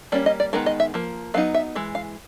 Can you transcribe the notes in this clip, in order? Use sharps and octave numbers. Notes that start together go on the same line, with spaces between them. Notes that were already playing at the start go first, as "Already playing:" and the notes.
G3 A#3 C#4 D5
D#5
D5
D#3 G#3 B3 D#4 A#4
D#5
E5
F3 A#3
F#3 B3 D#4 F5
E5
E3 G#3
F5